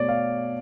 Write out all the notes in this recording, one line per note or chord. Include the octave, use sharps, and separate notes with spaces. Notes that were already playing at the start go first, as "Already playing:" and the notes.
Already playing: B2 A3 C#5 D5
F5